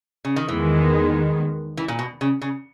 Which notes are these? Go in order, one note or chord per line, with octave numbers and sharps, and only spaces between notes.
C#3
D#3
E2 D#3 E3 G#3 B3
E3
A#2
B2
C#3
C#3